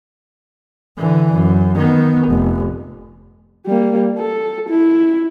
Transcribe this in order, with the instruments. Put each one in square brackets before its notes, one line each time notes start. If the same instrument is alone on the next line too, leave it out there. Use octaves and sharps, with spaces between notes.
[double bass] D3 E3
F#2
D#3 B3
F1
[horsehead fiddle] G3 A#3
A4
E4